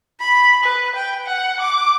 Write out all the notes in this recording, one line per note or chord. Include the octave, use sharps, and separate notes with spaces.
B5
B4
G5
F#5
D6